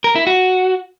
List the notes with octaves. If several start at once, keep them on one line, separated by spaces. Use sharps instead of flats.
A#4
E4
F#4